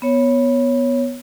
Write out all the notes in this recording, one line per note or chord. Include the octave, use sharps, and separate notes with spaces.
B3 C#5